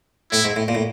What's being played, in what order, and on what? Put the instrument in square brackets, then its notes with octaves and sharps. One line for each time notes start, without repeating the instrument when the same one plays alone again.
[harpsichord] A2 [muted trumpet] E4
[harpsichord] G#2
A2
A#2
A2